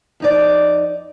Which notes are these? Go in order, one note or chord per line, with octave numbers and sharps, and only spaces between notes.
F2 D#4 D5